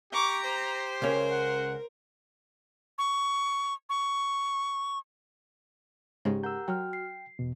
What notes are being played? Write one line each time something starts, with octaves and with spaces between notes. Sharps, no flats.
G4 A#5 C#6 D6
C5
C#2 C#3 C#4 A#4
F#5
C#6
C#6
G#2 C#3 G#3 G4
A#4 F#5 A#5 E6 G6
F#3 F#4 G5 F6
C7
E2 B2